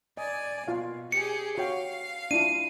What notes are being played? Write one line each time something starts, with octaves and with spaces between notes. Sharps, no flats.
D5 D#5 G#5
B2 F4 F5
G4 G#4 C#7
F#4 C#5 F5 G5
D4 E4 F4 D#7